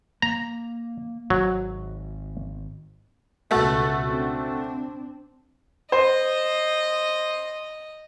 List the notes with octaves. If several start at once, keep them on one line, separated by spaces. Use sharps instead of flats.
A#3 A#5
G#1 F#3
C#2 B2 A3 F#4 A4
C4 D4
C5 D#5